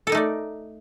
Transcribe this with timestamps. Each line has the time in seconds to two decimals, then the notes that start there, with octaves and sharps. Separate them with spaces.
0.07 A4
0.09 A#4
0.12 D#4
0.15 A3
0.17 D5